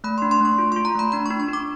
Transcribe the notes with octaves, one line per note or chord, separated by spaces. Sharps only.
A3 B5
C6
D4
C6
A3 C#6
F4
C6
F4
A#5
A3 B5
D4 B5
C#6
D4
C#6
D4 D6